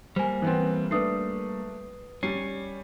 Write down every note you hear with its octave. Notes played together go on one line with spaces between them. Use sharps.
G3 A#3 C5 G#5
E3 B3 C4
A3 D4 B4 D#6 C7
G3 C#4 C7